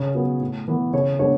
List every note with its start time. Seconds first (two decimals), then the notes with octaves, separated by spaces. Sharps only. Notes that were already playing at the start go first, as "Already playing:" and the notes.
Already playing: C#3 C#5
0.14 F#3 B3
0.41 A2
0.68 E3 B3
0.93 C#3 C#5
1.19 G#3 B3 D4 C#5